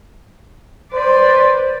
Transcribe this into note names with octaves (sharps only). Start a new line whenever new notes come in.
B4 C5 D5